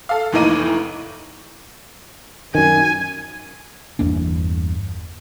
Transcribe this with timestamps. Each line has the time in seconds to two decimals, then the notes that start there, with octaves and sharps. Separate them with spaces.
0.09 A4 F5
0.33 F1 A2 E3 A#3 D#4 D#7
2.55 F#2 D#3 G#5
3.99 G1 E2 A#3 D4